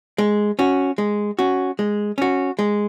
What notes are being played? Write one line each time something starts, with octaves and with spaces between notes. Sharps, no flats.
G#3
C#4 F#4
G#3
C#4 F#4
G#3
C#4 F#4
G#3